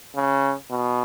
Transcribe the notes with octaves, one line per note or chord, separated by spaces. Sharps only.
C#3
B2